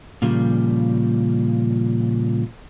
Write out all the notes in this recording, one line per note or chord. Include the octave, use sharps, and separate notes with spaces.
A#2 C#3 F3 G3